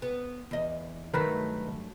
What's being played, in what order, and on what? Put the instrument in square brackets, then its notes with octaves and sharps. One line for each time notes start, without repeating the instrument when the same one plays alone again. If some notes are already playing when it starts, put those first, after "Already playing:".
[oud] B3
E2 D#5
[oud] G2 F#3 A3 [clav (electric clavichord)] D#3 A#4 B4